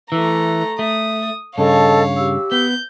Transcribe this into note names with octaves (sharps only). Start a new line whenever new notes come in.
E3 A3 A#5
A3 D#6
G2 C#3 A4 C#5 D#5 F5 A5
G4 E6
B3 G6